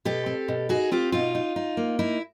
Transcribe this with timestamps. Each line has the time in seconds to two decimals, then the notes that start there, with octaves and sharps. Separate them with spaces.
0.05 B2 G4 A4
0.26 C4
0.48 B2
0.69 D#4 F#4 G#4
0.91 C4 F4 G4
1.12 B2 D#4 F4
1.35 D#4
1.56 D#4
1.77 A#3
1.99 D#4 E4